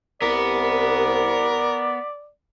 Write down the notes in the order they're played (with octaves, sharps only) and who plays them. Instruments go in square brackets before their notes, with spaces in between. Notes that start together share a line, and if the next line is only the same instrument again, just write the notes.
[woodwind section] C2 [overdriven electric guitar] B3 [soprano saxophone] A#4 [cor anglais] D5